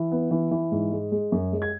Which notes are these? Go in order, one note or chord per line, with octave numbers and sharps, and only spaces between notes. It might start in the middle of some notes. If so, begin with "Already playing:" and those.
Already playing: E3
B3
E3
E3
G#2
G#3
G#3
F#2
G#3
G#6